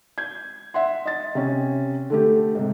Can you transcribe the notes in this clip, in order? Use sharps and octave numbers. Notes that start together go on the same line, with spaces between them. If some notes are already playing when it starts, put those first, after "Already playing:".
G6 G#6
E5 F#5 C6
D#5 A6
C3 C#4
D3 A3 G4
G#2 C3